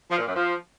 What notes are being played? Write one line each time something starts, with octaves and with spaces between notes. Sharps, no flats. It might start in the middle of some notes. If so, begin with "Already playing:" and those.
F3
A#2
F#2
F3